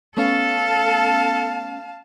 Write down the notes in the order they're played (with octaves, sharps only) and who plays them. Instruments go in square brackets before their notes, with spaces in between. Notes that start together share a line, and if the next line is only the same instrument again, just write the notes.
[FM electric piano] A3 B3 C#4 [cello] A4 [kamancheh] F5 A5